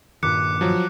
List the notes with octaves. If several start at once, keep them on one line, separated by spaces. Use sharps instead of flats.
G2 A#2 D#3 D6 F#6 C#7
F3 F#3